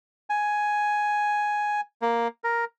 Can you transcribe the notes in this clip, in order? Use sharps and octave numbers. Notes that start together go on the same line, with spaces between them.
G#5
A#3
A#4